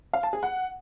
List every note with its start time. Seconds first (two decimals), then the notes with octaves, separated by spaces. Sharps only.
0.13 F5
0.23 A5
0.33 G#4
0.43 F#5